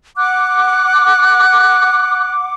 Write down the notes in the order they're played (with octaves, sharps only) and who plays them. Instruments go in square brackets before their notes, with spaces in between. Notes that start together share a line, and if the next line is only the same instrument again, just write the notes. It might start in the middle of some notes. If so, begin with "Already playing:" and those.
[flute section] F#5 D6 [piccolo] F#6